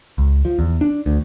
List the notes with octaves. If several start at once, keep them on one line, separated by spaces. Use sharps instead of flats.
C#2
F3
E2
D4
D2